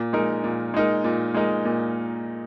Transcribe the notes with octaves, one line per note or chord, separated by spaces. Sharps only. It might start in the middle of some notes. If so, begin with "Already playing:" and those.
Already playing: A#2
G#3 D#4 A#4
A#2
G#3 D#4 A#4
A#2
G#3 D#4 A#4
A#2